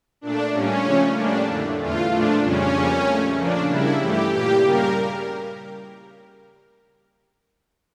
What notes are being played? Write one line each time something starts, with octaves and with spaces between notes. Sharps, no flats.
A#2 A3 D4
A2 G3 A#3 C#4
C#3 F3 A3
A2 G3 A#3 D4
F2 D3 A3
E2 E3 A3 F4
A#2 F3 A3 D4
F2 C#3 G3 C#4
F2 C#3 G3 A#3
A#2 A3
C#3 F3 A#3 D4
C#3 G3 A#3 E4
G2 E3 A3 G4
A#2 G3 A#3 G4
C#3 G3 A#3 A#4